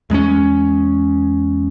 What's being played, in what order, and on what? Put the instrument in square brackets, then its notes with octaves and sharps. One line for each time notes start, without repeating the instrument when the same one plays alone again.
[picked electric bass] E2 G#3 A#3 C#4